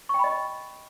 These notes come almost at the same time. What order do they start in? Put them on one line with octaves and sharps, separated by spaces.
C#6 G5 B5 D#5